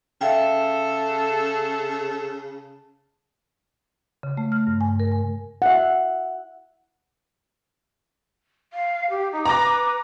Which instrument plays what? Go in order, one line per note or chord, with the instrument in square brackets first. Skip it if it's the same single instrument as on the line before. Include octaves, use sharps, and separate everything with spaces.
[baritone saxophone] C#3 [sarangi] A4 [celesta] E5 F5 G5
[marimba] C#3
A3
F6
G2
G#5
A#4
G#5
[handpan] E5 F#5
[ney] F5
G4
D#4
[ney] B4 [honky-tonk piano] A#5 D6 A#6